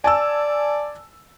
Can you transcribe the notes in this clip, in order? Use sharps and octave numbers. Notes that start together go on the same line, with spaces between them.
D5 G#5 A5 E6